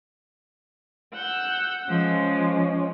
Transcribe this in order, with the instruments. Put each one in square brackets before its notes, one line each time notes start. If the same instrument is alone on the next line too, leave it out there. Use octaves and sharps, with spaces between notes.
[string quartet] F#5 E6 G6
[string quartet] F3 G#3 [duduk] C#4